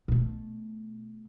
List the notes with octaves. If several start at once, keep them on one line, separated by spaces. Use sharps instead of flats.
B2 A3